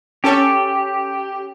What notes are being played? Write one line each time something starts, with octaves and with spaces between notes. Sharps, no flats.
C#4 G4 A4 C#5